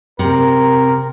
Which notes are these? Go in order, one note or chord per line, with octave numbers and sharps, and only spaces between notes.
C3 A#4